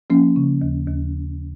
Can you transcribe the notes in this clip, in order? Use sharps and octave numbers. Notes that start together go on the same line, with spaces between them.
F3 A#3 C#4
C#3
D#2
D#2